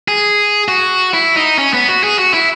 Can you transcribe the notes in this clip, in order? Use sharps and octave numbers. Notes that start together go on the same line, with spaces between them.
G#4
F#4
E4
D#4
C#4
B3
F#4
G#4
F#4
E4